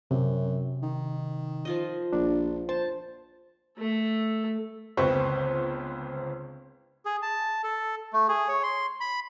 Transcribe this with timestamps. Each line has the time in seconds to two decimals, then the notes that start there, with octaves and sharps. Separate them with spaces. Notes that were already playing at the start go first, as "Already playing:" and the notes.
0.11 F#2 C3
0.82 D#3
1.65 F3 F4 D#5
2.13 A#1 D4
2.69 C5 A5
3.78 A3 A4
4.97 G1 C#2 C4 B4 C5 C#6
7.05 G#4
7.22 A5
7.64 A4
8.13 A3
8.29 G#4
8.48 C#5
8.63 C6
9.01 B5